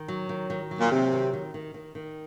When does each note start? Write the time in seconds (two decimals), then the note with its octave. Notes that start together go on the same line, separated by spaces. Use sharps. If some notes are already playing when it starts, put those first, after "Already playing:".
Already playing: D#3
0.08 F#3
0.29 D#3
0.50 D#3
0.71 F#3
0.80 A#2
0.91 C3 F#3
1.13 D#3
1.33 D#3
1.54 D#3
1.74 D#3
1.95 D#3